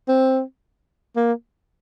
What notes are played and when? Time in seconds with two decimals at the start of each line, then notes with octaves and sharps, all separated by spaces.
0.08 C4
1.16 A#3